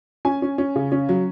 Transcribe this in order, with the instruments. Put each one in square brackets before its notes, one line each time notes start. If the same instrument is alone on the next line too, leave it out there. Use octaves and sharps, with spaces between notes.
[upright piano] C#4 G#5
C#4
C#4
C#3
C#4
F#3